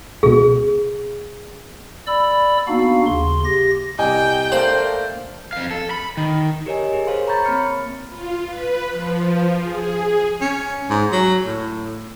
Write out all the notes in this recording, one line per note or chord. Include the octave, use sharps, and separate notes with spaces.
C#2 B2 G#4
D5 B5 E6
A#3 B3 D4 D#4 F#4 F5
D#2 C#3 C6
G4 A#6
C2 D#5 G5 G#5
A3 A#3 D4 C5 F#7
F2 F5
A4
B5
D#3
G4 A#4 C#5 D#5 G#5
G#4 A#4
C5 C#5 F5 C6
C#5 A#5 B5 C#6 G6 A6
A#3 C4 C#5 B5 F6 C#7
F4
B4
F3
G#4
C#4
G#2
F#3
A2